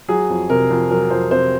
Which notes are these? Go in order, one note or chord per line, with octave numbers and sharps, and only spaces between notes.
F#3 G#4
F2
C3 A#4
F2
F#3 A#4
F2 C5
C3 C5